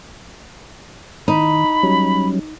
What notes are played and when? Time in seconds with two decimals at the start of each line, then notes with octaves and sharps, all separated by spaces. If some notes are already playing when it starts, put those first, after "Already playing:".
1.28 D#3 D#4 B5
1.83 F#3 G3 C#4